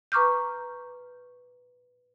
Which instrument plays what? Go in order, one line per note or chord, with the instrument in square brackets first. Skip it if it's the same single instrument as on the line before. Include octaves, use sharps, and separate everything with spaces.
[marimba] B4 A#5 C#6 D6 F6 G6